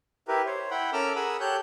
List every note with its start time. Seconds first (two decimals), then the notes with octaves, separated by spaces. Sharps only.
0.28 E4 G4 A#4 B4
0.46 C5 C#5
0.71 E4 F#5 G5 B5
0.93 C#4 A4 A#4 D6 E6 F6
1.16 G#4 A#4 F#5 B5 D#6 E6
1.40 G4 A4 C#5 F#6 G6